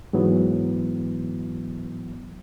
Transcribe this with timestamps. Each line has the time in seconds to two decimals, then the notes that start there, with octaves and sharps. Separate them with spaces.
0.13 G#2 E3 F#3 B3